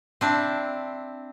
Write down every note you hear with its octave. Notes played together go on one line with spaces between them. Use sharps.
C4 D4 E4